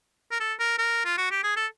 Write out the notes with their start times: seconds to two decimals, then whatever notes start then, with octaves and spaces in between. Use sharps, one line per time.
0.32 A#4
0.40 A4
0.60 A#4
0.78 A#4
1.05 F4
1.18 F#4
1.31 G4
1.43 G#4
1.56 A4